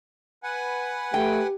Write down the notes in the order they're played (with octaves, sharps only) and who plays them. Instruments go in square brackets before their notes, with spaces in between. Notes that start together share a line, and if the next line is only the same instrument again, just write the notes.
[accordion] B4 F#5 G#5
[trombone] A3 [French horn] G4 [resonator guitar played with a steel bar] G5